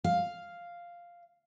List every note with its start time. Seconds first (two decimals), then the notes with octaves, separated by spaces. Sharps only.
0.04 F5